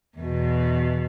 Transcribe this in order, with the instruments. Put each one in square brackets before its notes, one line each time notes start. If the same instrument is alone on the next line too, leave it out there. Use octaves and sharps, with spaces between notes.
[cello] E2 B2